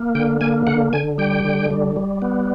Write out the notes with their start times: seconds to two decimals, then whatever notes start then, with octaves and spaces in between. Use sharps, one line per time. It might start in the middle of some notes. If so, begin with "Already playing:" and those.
Already playing: A#3
0.15 D3 G5
0.41 A#3 G#5
0.67 D3 F#5
0.93 D3 G#5
1.18 G3 G5
1.44 D3
1.70 G3
1.96 G3
2.22 B3